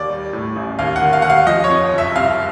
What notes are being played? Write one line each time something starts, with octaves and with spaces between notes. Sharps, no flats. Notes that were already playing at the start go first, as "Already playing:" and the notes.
Already playing: D#2 D5
G3
A2
A1
D#2 F5
F#5
D#3
F5
D#2 F#5
F5
F3 D#5
C#5
F2
F#1
E5
C2 F5